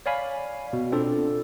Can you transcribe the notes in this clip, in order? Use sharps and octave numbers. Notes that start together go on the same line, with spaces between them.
C#5 D5 F5 G#5 B5
B2
C4 D4 F4 A4